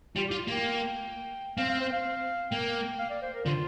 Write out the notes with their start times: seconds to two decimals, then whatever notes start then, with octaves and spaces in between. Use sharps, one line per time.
0.16 G3 F4
0.28 F4 G4
0.39 F4
0.47 A#3 G5
1.58 C4 F5
1.69 F5
1.81 C5
1.93 F5
2.51 A#3 G5
2.99 F5
3.10 D5
3.22 C5
3.34 A#4
3.46 D3 F4